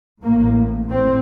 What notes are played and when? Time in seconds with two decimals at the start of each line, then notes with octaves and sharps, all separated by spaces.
0.22 A1 A2 A#3
0.89 A2 C4